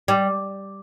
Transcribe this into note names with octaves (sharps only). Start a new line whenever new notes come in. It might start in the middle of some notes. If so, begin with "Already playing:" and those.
G3